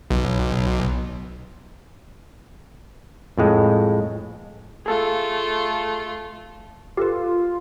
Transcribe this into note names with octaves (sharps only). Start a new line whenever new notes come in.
B1
F2 A2 G#3
A3 F4 G#4 A4 F5
F4 G4 A4 B4